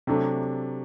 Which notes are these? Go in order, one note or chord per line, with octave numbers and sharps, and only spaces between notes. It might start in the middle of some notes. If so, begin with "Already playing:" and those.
C3 F#3 A3 D4